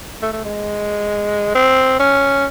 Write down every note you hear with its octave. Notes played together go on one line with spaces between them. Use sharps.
A3
A3
G#3
C4
C#4